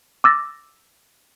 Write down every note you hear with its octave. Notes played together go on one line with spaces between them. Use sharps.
D6 E6 A6 A#6